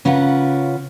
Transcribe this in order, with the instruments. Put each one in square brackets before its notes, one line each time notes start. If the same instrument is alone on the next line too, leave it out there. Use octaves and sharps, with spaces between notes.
[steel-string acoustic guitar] C#3 C#4 F4 A#4 B4 F#5